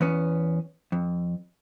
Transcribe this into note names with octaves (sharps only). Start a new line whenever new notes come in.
E2 B3 C#4
F2